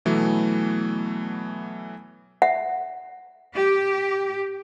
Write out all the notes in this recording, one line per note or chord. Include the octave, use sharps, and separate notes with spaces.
B2 E3 F#3 A3 B3
E5 F#5
G4